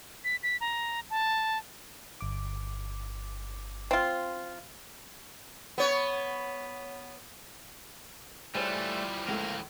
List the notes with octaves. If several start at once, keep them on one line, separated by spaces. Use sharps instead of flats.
B6
B6
A#5
A5
G1 D6
C4 F4
B3 C#5
E3 F3 G3 A3 G#4 C5 C#5
C#2 G#3 A3 A#4 F5